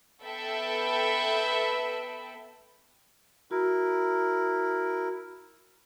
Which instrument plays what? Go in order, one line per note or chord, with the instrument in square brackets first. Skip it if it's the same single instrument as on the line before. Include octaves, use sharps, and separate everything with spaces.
[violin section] B3 A4 E5 G5 B5
[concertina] E4 A#4 [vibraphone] F#4